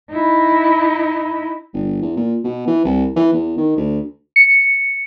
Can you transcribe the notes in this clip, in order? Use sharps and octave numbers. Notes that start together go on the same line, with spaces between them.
D#4 E4
G1
E2
A#2
B2
E3
C2
E3
E2
D#3
D2
C#7